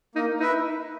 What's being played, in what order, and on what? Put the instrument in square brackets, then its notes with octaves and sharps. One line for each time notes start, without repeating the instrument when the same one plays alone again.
[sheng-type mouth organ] A#3 [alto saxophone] D#4
[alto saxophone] D#4 [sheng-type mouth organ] E4 B4 E5